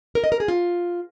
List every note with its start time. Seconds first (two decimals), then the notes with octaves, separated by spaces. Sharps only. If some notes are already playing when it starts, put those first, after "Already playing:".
0.15 A#4
0.24 D#5
0.32 A#4
0.40 G#4
0.48 F4